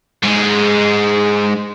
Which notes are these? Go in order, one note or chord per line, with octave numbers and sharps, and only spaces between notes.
G#2 G#3